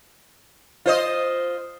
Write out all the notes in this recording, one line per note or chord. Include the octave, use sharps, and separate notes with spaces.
F4 C5 D#5